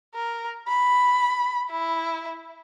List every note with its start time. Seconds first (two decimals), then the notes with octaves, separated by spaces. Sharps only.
0.14 A#4
0.68 B5
1.71 E4